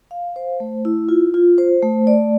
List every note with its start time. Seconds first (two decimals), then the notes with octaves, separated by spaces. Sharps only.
0.11 F5
0.36 C5
0.60 A3
0.85 E4
1.09 F4
1.34 F4
1.58 C5
1.82 A3
2.07 D5